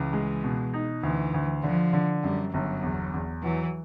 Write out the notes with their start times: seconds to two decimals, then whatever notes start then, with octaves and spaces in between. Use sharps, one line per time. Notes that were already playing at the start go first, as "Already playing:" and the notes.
Already playing: C#2 E3
0.13 G#3
0.44 B2
0.74 D#4
1.03 D2 E3
1.34 D2
1.63 D3 F3
1.93 D3
2.23 F#2 G3
2.53 G1 F#3
2.83 E2
3.14 E2
3.43 E3 F#3